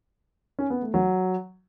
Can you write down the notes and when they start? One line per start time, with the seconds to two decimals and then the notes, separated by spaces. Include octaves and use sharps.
0.59 C#4
0.70 B3
0.82 A3
0.94 F#3